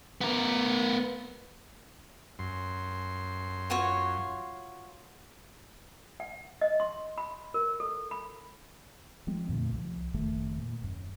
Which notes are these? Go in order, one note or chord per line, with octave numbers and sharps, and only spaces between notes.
B3 A#4
F#2 C6
F4 F#4 C#5
F#5
D#5
C6
B5
A#4
A4
B5
F3 G#3 C4
F2 A#2 D3 A3
C2 F3
F#1 F2 D#3 A3
A#2
D#1 F#2